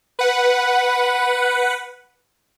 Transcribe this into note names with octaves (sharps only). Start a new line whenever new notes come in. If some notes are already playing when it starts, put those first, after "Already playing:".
B4 F#5